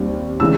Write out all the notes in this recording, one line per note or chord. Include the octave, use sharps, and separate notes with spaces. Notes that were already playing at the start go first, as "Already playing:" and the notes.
Already playing: D#2 G3 C4
C#3 E3 G#3 E6